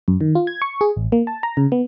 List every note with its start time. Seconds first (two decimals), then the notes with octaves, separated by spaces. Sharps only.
0.08 F#2
0.21 D#3
0.35 F4
0.47 G#6
0.62 C#6
0.81 G#4
0.96 A1
1.12 A#3
1.27 A5
1.43 A#5
1.57 C#3
1.72 B3